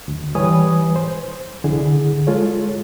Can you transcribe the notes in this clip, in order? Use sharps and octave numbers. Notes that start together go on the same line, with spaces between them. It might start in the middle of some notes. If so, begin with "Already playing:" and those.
D2
E3 G3 B4 C#5 G#5 D#6
C5
C2 D3 E4 G#4
G#3 F4 A4 C#5